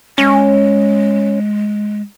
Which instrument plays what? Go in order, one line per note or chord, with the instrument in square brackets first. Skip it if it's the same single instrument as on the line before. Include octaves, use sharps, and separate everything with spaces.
[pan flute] G#3 [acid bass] C#4